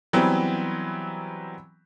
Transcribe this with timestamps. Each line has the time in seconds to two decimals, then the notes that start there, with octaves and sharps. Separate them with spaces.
0.13 E3 F#3 G3 B3 C4